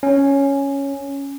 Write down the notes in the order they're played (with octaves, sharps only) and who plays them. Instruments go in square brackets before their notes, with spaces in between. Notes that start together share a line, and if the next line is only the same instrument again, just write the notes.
[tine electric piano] C#4